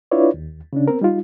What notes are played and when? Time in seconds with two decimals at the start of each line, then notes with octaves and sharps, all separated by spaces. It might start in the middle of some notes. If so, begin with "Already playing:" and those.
0.11 D4 E4 F4 B4 C#5 D5
0.34 D#2
0.73 C#3 C#4 D4
0.88 B3 C4 A#4
1.01 G3 D#4 F4